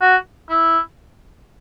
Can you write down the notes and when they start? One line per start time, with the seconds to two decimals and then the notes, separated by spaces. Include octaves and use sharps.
0.01 F#4
0.49 E4